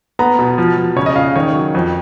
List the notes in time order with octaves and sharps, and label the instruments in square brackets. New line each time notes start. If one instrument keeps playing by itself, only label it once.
[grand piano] B3 A#5
B2
F3
F3
C#3 C#5
D#5
C#3 F5
D#3 C#5
F#3
F2